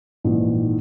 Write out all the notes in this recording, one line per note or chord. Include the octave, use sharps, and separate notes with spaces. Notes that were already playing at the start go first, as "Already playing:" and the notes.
A#1 G#2 E3